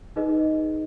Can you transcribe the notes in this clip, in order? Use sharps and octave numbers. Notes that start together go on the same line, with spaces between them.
D#4 G#4 B4 D#5